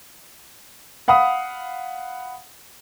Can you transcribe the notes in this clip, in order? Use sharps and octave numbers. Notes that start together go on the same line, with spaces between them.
F5 F#5 B5 D#6